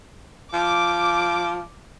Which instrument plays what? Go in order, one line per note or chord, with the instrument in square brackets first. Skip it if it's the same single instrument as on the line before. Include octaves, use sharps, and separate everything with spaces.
[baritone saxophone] F3 [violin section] D6